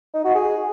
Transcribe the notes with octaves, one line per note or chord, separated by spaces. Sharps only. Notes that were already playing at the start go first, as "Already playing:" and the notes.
D#4
F#4
G#4